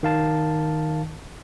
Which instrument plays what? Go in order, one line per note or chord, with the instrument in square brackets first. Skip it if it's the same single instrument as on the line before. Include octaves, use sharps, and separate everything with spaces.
[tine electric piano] D#3 F5 A5